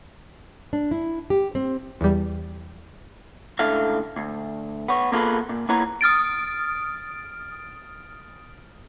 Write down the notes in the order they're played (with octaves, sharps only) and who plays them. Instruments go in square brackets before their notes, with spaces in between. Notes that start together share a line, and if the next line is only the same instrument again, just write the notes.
[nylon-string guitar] D4
E4
G4
C4
[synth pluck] E2 G3
[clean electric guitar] C#2 A2 D4 A4 E5 F5
D2
B3 C#5
A#3 B3 F4 G#4 A4 B4
A#2
A#3 B3 E4 B4 C#5 A#5
[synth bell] D#6 F6 A6 D7